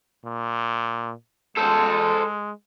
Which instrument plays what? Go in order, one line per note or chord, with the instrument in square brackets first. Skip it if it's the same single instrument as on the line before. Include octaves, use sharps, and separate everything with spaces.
[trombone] A#2
[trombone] G#3 [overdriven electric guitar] A4 C5